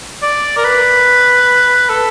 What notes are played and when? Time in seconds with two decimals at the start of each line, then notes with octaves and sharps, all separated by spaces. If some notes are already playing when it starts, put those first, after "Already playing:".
0.23 D5
0.57 A#4
0.64 B4
1.89 A4